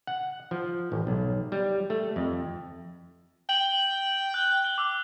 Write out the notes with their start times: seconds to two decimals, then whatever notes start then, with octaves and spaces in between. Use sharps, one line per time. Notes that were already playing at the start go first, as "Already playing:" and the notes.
0.07 F#5
0.51 F3
0.92 A1
1.07 B1
1.52 G3
1.90 A3
2.16 F2
3.49 G5 F#7
4.34 F#6
4.65 G7
4.78 D6 E6